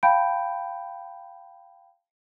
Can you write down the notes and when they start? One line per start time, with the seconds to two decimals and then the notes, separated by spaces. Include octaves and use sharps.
0.03 F5 G5 A5 B5 G6 D7